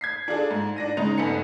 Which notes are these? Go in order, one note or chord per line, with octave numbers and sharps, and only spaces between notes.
G#6 B6 C7
D4 F4 G#4 A4
G#2
D4 A#6 D#7
C#3 G#3 D#4 A#5 F7
G1 B3 A4 G#5 C#7